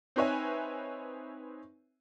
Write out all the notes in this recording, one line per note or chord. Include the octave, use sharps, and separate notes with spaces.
C4 D#4 B4 C#5 E5 G#5